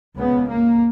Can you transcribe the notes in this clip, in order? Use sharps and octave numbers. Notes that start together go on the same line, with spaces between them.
C#2 C#3 B3
A#3